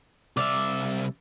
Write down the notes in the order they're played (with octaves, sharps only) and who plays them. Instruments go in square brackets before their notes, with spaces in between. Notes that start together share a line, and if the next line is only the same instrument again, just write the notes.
[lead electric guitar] C2 E5 [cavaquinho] D5 F5